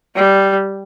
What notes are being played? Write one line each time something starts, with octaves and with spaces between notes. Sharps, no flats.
G3